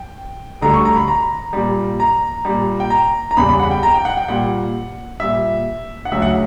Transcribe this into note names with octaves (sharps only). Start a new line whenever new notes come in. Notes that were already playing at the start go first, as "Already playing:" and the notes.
Already playing: G5
D2 D3 G3 A#5
C#6
A#5
B5
A#5
A#2 G3
A#5
A#2 G3
G5
A#5
A#5
E2 C#3 G3 B5
B5
F#5
G5
A#5
G5
F#5
G5
A#2 G3 F#5
A#2 G3 E5
F#5
D2 C#3 F#3 E5
F#5